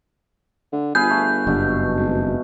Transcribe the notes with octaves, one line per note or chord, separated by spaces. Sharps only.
D3
G1 G#4 B4 F5 G6
A3
F#1 G2 B2
G#1